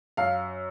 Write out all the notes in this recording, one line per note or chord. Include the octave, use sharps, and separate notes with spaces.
F#2 F5